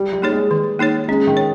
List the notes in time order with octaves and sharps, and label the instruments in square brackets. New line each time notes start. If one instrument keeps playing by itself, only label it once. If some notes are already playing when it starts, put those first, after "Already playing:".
Already playing: [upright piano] G3
G3
[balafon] A#3 D#4 G#4 C#5
[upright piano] G#3
[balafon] D#3
A#3 D#4 G#4 C#5
[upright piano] G#3 [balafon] C#4
[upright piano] D#3
[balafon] C#5